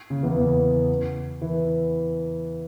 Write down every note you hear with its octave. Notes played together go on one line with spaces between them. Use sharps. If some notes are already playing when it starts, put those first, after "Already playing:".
C#3
E2 E3
E2 E3
E3